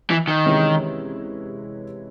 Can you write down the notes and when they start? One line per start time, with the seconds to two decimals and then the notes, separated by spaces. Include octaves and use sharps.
0.10 E3
0.28 D#3
0.45 C3 E3 G#3 C#4 E4